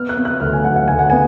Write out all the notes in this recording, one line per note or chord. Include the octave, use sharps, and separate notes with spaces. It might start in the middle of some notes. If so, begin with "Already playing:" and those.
Already playing: B3 F6
F#6
B3
F#6
D2 F6
G#5
F#3 F#5
F#5
D2 G#5
F#5
B3 G#5